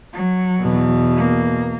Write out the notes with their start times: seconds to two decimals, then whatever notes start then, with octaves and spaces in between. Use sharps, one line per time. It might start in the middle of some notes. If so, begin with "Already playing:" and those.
0.13 F#3
0.60 E2 B2
1.16 A#3